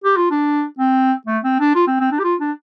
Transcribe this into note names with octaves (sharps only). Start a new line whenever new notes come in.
G4
F4
D4
C4
A3
C4
D4
F4
C4
C4
D4
G4
F4
D4